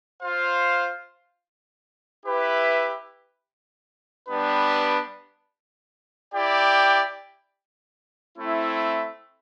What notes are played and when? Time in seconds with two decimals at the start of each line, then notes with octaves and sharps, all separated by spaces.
0.21 F4 C5 F5
2.25 E4 G4 B4 E5
4.28 G3 B3 D4 G4 B4
6.34 E4 G4 D5 G5
8.37 A3 C4 E4